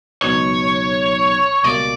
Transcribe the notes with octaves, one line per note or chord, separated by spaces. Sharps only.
C#2 B2 F#3 B3 D#4 C#5
C#2 B2 G3 A#3 D5